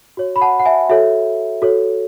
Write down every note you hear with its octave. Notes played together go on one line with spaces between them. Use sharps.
F#4 C#5
B5
F#5 A5
F#5
E5 G#5
F#4 A4 C#5 E5
F#4 A4 C#5